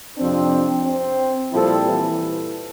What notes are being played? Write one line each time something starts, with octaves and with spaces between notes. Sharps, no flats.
F2 C3 F3 C4 D4
C4
A#2 F3 G3 C4 E4 A4
E3